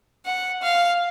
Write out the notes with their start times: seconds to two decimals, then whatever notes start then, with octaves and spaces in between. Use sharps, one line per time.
0.26 F#5
0.62 F5